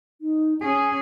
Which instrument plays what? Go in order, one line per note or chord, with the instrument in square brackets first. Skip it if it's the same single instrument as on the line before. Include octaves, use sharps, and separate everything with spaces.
[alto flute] D#4
[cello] C#4 G#4 [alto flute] G#5